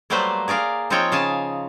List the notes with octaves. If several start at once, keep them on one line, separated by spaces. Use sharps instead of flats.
F#3 G3 A3 A#3 B4 C5
G#4 A#4 D5 F5
F3 C4 D#4 F4 C#5 G5
C#3 F5 G#5 A5